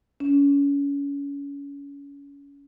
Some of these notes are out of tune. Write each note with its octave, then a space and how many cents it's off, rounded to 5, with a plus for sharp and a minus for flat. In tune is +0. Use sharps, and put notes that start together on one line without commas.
C#4 +30